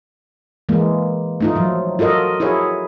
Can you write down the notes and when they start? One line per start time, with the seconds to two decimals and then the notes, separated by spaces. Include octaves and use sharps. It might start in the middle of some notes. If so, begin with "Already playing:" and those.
0.69 E3 G#3 A#3
1.40 A3 D#4 F4
1.56 F3 F#3
1.99 F4 F#4 A4 A#4 D#5
2.40 E4 F#4 G#4 A#4 C#5